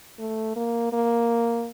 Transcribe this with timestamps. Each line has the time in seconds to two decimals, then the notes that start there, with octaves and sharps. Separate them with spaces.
0.19 A3
0.56 A#3
0.93 A#3